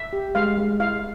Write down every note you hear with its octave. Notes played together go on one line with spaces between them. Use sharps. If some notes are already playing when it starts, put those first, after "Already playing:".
Already playing: E5
G4
G#3 F5
G#3
E4 F5